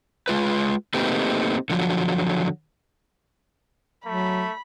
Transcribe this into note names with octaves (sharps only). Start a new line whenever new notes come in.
G#3 F4 B4
A3 A#3 C4 D#4 G4 B4
D3 F3 F#3
F#3 A3 B5